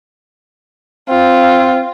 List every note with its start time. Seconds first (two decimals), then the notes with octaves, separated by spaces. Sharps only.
1.09 C4 F4